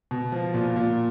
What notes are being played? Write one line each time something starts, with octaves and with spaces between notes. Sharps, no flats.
B2
F3
A#2
A#2